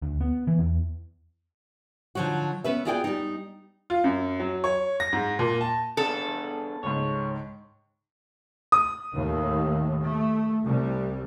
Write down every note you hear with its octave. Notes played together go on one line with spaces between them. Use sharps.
D2
B3
E3
E2
D3 F3 F#3 D#4 F#4
B3 C#4 B4 E5
F4 F#4 G#4 D5 E5 G5
G3 D#4
F4
F#2
F#3
C#5
A#6
G#2
A#2
A5
B3 D4 G#4 A4
C#2 G#2 C#5
D#6
D#2 A2
A3
C2 G3